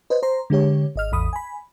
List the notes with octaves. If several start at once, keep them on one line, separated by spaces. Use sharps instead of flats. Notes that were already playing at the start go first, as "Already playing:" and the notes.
B4 C5 D#5
C5 A#5 C6
D3 G#3 G4 C#5
G#1 D#5 F6
A1 E2 B5 D#6
G#5 B5